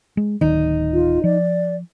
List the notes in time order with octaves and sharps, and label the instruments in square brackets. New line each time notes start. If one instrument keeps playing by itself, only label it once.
[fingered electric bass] G#3
[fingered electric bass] D1 D#3 [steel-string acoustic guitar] D#4
[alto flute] F4
[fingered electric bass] F3 [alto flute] D5